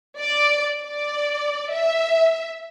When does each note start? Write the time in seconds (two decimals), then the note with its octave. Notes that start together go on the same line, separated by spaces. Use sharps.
0.19 D5
0.84 D5
1.73 E5